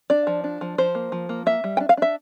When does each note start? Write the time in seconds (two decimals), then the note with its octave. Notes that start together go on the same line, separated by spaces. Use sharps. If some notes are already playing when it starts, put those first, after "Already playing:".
0.10 D4 D5
0.27 F3
0.44 D4
0.61 F3
0.78 F3 C5
0.95 A#3
1.12 F3
1.29 A#3
1.46 A#3 E5
1.64 G3
1.77 G5
1.80 D4
1.89 F5
1.97 D4 E5